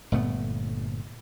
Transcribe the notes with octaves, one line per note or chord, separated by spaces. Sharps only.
G1 A#2 A3 B3